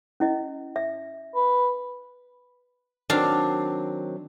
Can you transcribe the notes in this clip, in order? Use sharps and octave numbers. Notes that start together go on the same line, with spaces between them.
C#4 E4 D#5
E5
B4
D#3 F#3 C4 D4 F5